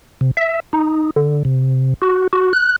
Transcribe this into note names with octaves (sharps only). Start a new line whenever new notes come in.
C3
E5
D#4
D3
C3
F#4
F#4
F#6